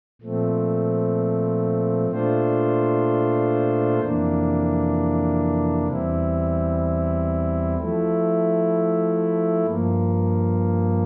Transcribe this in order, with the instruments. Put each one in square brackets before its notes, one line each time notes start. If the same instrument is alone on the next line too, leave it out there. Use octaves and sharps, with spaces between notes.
[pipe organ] A#2 F3 A3 C4
A#2 A3 D4 F4 C5
F2 C3 E3 A#3 D4
E2 E3 G3 C4 E4
F3 A3 E4
G2 F3 A#3